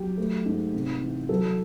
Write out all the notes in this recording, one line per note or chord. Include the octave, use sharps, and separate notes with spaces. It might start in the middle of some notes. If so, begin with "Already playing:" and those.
Already playing: F#3 G4
A3
G#2
C3
E3
F#3 A4